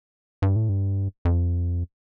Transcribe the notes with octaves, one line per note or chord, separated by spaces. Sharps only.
G2
A2
G2
F2